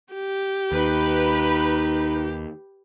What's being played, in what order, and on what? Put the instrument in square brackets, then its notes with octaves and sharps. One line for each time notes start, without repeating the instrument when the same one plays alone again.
[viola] G4
[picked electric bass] D#2 [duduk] D#4 [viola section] B4